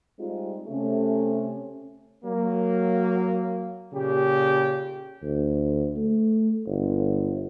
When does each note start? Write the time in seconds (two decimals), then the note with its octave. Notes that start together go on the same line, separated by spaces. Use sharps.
0.18 G3 G#3 C4 D#4 F4
0.68 C3 A3 C#4
2.25 F#3 A#3
3.93 A#2 C#3 G4
5.23 D2
5.97 A3
6.66 G1